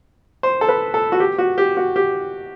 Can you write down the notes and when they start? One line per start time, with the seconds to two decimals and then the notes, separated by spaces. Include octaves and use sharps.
0.43 C5
0.61 A4
0.69 B4
0.94 A4
1.12 F#4
1.20 G4
1.38 F#4
1.58 G4
1.77 F#4
1.96 G4